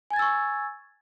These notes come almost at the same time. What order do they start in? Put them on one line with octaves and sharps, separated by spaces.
G#5 G#6 A6 E6 C#6